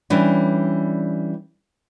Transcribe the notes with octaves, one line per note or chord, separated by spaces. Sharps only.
E3 G3 C#4 D4